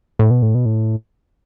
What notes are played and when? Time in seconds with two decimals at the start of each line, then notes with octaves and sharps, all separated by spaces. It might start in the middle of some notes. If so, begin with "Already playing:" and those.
0.19 A2
0.30 B2
0.42 A2
0.55 B2
0.65 A2